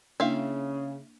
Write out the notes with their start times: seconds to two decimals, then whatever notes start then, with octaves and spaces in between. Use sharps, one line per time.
0.20 C#3 A#3 D4 E4 E5 F5